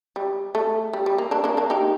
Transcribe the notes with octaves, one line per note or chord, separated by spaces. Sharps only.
G3
A3
G3
G3
A#3
A#3 D4
A#3 D4
A#3 D4
D#4 G4